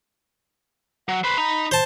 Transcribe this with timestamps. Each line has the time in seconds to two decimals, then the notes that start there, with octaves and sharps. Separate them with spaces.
1.09 F#3 F#5
1.24 B4 C5 B5
1.38 D#4 A#5
1.71 C5 A5